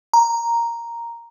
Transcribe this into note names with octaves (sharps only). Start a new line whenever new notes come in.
A#5